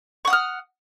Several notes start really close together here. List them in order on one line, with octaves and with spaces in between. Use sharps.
C#6 F#5 D#6 F6